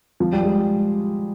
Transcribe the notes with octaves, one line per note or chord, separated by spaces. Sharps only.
F3
G3
G#3